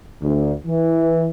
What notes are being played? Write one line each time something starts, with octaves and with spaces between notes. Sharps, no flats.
D2
E3